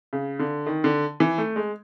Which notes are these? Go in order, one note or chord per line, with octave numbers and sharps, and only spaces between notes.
C#3
D3
D#3
D3
E3
A3
G#3